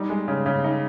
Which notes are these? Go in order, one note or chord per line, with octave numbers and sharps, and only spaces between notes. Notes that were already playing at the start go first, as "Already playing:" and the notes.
Already playing: G3 D#4
G#3
C#3
C#3
D#4